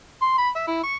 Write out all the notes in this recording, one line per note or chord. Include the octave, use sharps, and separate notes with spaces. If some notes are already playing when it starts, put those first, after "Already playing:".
C6
B5
E5
E4
C#6